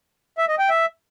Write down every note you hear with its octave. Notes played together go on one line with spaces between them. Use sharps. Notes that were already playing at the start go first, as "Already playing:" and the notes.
E5
D#5
G5
E5